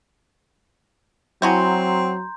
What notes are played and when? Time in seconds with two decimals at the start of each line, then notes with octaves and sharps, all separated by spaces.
1.42 F#3 C4 E4 F#4 G#4 A#5 C6 G6